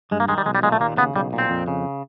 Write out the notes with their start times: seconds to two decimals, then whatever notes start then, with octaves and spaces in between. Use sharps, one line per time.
0.11 G2 G#3
0.20 A#3
0.28 D#3 G#3
0.38 G3
0.46 B1 G#3
0.55 G3
0.63 A#2 G#3
0.72 A3
0.80 D#2 A#3
0.98 C#3 B3
1.15 B1 G3
1.33 A#2
1.38 C4
1.50 F2
1.68 C#3